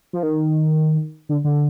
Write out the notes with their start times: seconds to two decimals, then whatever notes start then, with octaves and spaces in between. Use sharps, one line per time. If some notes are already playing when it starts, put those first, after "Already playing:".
0.13 F3
0.23 D#3
1.29 D3
1.44 D3